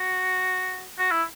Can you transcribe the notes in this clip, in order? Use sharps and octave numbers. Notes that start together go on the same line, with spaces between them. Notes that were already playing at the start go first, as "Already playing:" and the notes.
Already playing: F#4
F#4
E4